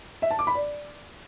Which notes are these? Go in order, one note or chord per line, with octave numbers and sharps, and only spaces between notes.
E5
A5
D6
B5
D5